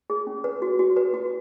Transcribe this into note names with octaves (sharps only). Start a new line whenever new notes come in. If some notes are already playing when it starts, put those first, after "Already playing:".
G#4
C#4
B4
F#4
F#4
B4
F#4